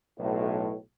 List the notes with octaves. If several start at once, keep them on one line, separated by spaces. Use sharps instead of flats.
B1 A2